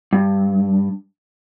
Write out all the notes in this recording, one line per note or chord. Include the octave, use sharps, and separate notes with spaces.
G2